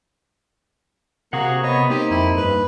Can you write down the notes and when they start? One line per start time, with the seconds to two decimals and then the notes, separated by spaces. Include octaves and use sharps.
1.33 C3 A#3 F#4 G#4 F#5
1.63 B3 C#5 D#5
1.90 A#3 C4 D#4 G4
2.11 F2 E4
2.37 G2 B4